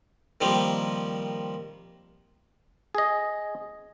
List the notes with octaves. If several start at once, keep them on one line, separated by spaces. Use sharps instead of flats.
D#3 F3 G3 A#3 C4
G#4 D#5